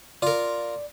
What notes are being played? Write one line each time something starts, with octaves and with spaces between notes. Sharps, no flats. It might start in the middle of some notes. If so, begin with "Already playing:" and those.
F4 A#4 D5